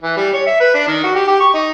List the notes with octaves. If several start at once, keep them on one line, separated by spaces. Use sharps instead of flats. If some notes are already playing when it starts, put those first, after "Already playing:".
E3
G3
C#5
E5
B4
D4
D#3
F#4
G4
G4
C#6
D#4